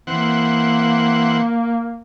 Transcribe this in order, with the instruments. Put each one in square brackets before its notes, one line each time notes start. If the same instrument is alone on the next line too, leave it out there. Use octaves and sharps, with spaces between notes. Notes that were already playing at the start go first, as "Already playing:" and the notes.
[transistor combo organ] E3 C4 F#5 [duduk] A#3